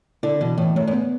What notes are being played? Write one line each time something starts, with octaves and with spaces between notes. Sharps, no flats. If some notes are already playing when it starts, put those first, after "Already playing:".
D3 E4
B2 E3
A2 E3
F#2 A3
F#2
B3